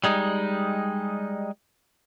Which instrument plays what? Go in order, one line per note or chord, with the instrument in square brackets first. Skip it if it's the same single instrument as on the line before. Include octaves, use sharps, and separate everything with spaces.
[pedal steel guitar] G3 G#3 D#4